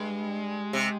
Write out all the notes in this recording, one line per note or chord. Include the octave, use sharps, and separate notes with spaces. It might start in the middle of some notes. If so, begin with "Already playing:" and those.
Already playing: G2 G#3
C3